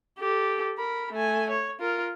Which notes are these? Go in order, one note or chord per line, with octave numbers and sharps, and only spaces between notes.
G4 A4
A#4 B5
A3 G#5
C#5
F4 A#4